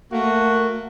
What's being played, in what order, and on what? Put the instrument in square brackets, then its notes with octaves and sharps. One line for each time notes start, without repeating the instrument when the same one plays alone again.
[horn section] A3 A#3 F#4